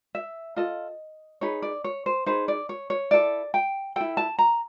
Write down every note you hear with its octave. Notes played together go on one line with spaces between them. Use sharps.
E5
F4 A4 D#5
D#4 G#4 B4 C#5
D5
C#5
C5
D#4 G#4 B4 C5
D5
C#5
C#5
E4 A4 D5
G5
E4 A4 G5
A5
A#5